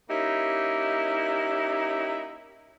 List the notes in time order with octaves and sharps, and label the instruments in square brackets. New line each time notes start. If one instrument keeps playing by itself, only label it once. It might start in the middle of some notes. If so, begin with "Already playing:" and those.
[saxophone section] A#3 C#4 D#4 E4 G4